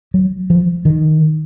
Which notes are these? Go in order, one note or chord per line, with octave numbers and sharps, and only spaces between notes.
F#3
F3
D#3